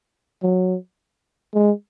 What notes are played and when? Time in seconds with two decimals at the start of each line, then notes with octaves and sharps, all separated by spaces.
0.43 F#3
1.54 G#3